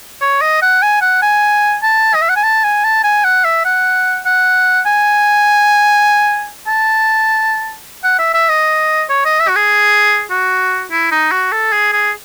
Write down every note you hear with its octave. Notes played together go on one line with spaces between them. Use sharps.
C#5
D#5
F#5
G#5
F#5
G#5
A5
D#5
E5
F#5
G#5
A5
G#5
A5
G#5
F#5
E5
F#5
F#5
G#5
A5
F#5
E5
E5
D#5
C#5
D#5
E5
F#4
G#4
F#4
E4
D#4
F#4
A4
G#4
G#4